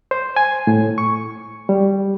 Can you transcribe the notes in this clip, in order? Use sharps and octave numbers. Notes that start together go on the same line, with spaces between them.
C5
G#5
A2
C#6
G3